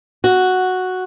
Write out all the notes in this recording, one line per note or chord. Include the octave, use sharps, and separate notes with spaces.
F#4